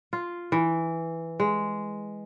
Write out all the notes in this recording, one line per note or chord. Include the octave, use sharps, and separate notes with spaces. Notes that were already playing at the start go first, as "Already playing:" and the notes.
F4
E3
G#3